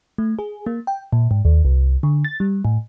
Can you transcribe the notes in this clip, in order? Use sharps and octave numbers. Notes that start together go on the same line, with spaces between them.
A3
G#4
A#3
G5
A#2
G#2
D#2
C2
D3
A6
G3
A2